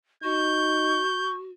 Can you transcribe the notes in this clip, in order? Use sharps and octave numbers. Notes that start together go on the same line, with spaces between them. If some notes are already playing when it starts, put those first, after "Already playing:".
D#4 F#4 C#6 G6